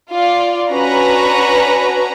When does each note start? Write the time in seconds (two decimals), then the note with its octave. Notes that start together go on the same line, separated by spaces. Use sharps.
0.11 F4 D5
0.71 C#4 D4 F#4 B4 A#5